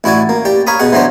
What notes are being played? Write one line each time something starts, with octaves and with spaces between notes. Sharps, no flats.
A1 E4 F#4 D5 G#5
A#3
G4 D5
C#5 F5 A#5 B5 D#6
B2 G#4 F#5
E3 F#3 B3 D4 C5